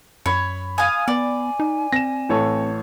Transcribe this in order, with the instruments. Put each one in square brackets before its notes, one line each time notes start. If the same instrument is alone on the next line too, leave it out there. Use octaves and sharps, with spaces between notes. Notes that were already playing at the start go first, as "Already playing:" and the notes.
[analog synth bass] F#2 [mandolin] C#5 [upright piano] B5 G#6
[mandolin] F5 G#5 [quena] D#6
[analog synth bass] B3 [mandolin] D5 [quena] G#5
[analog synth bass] D#4
[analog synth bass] C4 [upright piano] A#6 E7
[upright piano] A1 A4 C#5